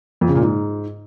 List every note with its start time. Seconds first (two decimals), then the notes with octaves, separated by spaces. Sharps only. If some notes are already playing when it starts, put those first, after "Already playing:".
0.21 F2
0.28 C#3
0.35 A#2
0.42 G#2